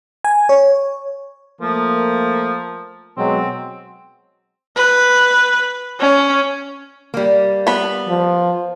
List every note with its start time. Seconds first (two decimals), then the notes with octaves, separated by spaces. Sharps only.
0.24 G#5
0.49 C#5
1.61 F3 A3 A#3
3.17 B2 F#3 G#3 C4
4.76 B4
6.01 C#4
7.14 G3 A#3
7.67 B3 B5
8.09 F3